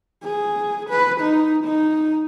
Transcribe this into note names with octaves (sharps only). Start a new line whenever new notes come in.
G#4
B4
D#4
D#4